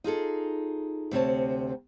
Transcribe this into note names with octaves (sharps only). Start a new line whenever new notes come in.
D#4 F4 G#4 A4
D2 C3 C4 C#5 A5